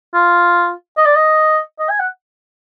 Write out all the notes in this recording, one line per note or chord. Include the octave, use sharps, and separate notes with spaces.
F4
D#5
D5
D#5
D#5
G#5
F#5